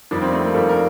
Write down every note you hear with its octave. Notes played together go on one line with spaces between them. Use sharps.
F2 D#3 G3 D4
C4
A3
A#3
F2 D#3 G3 A4
A#4